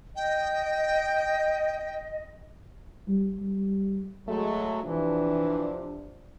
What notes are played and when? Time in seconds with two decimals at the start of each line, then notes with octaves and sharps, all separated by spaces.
0.16 D#5 G5
3.08 G3
3.40 G3
4.27 F#3 G#3 A3
4.84 C3 E3 F3 D4